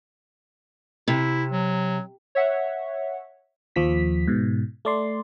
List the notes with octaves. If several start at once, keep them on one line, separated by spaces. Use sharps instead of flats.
C3 E4
F#3
C#5 E5 F#5
D#2 F3 B6
G#2 B2
A3 D5 C6